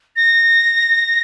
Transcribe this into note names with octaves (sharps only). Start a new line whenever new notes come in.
A#6